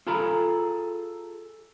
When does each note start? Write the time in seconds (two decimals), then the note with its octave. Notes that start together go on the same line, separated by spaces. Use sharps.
0.07 F4 G#4 A4 A#5 B5